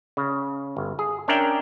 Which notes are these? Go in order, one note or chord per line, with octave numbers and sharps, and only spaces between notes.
C#3
G1
G#4
C#4 D4 A#4 D5 E5 G5